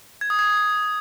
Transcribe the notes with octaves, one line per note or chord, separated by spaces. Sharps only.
G#6
D#6
G#6